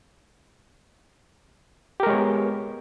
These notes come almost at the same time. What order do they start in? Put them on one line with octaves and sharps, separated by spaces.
G4 A#4 G#3 C#5 B3